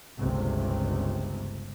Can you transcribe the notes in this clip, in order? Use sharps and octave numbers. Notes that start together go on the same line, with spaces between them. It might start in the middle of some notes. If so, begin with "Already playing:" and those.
G1 C#2 C3